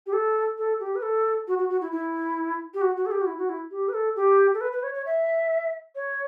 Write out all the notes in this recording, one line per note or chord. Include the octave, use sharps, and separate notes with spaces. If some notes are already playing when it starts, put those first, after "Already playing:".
G4
A4
A4
G4
B4
A4
F#4
F#4
F#4
E4
E4
G4
F#4
F#4
A4
G4
F#4
E4
F#4
E4
G4
B4
A4
G4
A4
B4
B4
C#5
C#5
E5
C#5